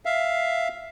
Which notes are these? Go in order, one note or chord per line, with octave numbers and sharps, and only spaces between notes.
E5 F5